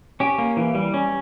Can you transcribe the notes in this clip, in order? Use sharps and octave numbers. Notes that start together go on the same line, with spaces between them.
C#4 G4
A#3
E3
G3
C#4